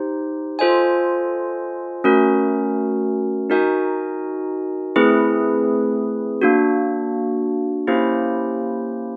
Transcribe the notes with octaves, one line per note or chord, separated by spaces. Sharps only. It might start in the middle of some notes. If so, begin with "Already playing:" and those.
Already playing: D#4 G4 C5
F4 A4 C5 D#5 G#5
A3 C#4 F#4 A#4
D#4 F#4 A#4 D#5 G#5
A3 C4 E4 G#4 B4
A#3 D4 F#4
A#3 C#4 E4 G4 C5